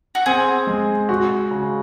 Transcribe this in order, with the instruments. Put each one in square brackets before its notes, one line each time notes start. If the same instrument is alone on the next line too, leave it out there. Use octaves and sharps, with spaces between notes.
[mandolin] F#4
[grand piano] C4 [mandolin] G#4
[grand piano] G#3
F#4
C#3